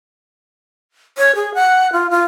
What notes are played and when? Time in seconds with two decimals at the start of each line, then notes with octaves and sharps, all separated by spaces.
1.18 C#5
1.35 G#4
1.54 F#5
1.92 F4
2.11 F4